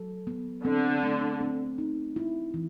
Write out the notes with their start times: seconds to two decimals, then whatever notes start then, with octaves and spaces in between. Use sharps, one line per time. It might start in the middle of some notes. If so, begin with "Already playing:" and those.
Already playing: F#3 A4
0.27 B3
0.65 D3 C4
1.03 A3
1.41 C4
1.78 D#4
2.16 E4
2.54 E3